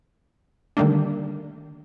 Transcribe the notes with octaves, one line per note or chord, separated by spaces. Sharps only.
D3 D#3 G3 A3 A#3 D4